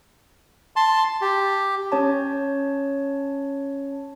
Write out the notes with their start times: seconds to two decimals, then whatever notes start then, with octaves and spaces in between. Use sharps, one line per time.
0.76 A5 C6
1.21 G4
1.92 C#4 C#5 A5